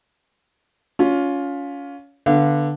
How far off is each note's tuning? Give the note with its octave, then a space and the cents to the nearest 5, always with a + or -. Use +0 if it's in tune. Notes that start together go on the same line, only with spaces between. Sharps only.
C#4 +25 F4 +15
D3 +0 B3 -10 F5 -30